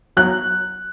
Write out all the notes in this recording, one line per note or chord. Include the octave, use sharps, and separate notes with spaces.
F#3 F#6